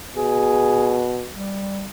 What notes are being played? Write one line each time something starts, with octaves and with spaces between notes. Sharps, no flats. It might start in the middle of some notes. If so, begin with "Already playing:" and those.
B2 G#4
G3